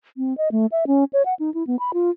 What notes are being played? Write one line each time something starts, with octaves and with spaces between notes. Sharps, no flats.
C4
D#5
A3
E5
C#4
C#5
F#5
D#4
E4
B3
B5
F4